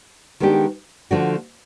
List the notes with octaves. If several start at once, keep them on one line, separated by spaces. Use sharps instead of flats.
D#3 G#3 B3 D4 G4
D3 F3 A3 D4 F#4